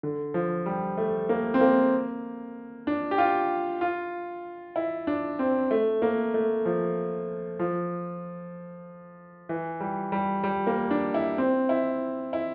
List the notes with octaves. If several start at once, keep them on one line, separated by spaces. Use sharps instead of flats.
D3
F3
G3
A3
A#3
C4
A#3
D4
G4
F4
F4
E4
D4
C4
A3
A#3
A3
F3
F3
E3
G3
G3
G3
A#3
D4
E4
C4
E4
E4